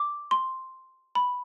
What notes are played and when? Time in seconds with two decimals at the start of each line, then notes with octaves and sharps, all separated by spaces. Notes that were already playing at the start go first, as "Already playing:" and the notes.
Already playing: D6
0.31 C6
1.15 B5